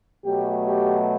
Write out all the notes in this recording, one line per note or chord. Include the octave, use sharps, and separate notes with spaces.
B2 F#3 A3 G4
G4